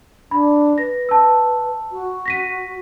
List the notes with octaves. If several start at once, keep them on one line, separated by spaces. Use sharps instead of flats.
D4 B5
B4 A#6
A5 E6
F#4
A#6 B6 D#7